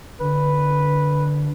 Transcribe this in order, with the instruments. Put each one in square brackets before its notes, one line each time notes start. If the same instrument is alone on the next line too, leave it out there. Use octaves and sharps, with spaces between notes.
[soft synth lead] D3 [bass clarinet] B4